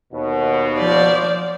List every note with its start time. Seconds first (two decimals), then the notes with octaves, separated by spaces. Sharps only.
0.12 D#2 B2
0.78 F3 D5